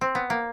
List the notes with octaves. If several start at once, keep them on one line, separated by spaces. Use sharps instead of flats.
C4
B3
A#3